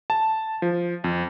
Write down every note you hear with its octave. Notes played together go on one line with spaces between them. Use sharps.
A5
F3
F2